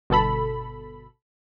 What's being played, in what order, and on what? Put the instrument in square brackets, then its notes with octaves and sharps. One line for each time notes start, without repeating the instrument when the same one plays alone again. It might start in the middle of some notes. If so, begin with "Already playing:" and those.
[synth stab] G1 B2 A4 B5